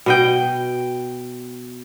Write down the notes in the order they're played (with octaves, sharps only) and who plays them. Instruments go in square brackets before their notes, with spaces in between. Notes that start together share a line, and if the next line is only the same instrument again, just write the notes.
[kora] B2 D#5 G5